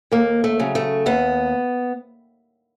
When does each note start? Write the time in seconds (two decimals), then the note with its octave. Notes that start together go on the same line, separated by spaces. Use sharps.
0.12 D#2 A#3
0.44 A3
0.60 C#3 F#3
0.75 A3
1.06 D#2 B3